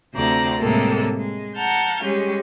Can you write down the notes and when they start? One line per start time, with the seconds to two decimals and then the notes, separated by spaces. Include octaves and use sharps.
0.13 D2 C3 C5 D5 A#5
0.59 A2 C3 G3 G#3 A#3 A4
1.17 G#3
1.56 F#5 A5 A#5 F6 G6
2.01 G3 G#3 C#4 G4